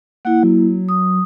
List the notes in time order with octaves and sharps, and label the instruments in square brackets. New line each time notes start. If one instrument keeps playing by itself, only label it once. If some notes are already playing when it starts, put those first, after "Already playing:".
[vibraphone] A#3 E4 [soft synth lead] F#5
[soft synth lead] F#3
[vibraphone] D#6